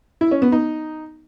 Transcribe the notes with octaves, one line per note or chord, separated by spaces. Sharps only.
E4
C#4
B3
D#4